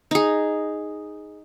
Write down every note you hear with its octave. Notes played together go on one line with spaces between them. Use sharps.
D#4 G#4